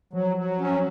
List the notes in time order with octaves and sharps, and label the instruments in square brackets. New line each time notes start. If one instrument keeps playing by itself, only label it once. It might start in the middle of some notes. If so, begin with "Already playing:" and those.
[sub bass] F3 [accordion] F#3
[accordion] F#3
C#4